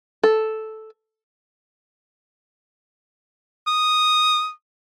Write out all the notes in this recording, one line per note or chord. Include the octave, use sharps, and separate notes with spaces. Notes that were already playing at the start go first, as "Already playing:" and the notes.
A4
D#6